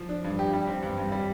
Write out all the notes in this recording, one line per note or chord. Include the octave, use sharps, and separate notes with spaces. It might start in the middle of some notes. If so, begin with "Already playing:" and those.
Already playing: F3
D4
G2
G4
G3
C4
G2
G2
G3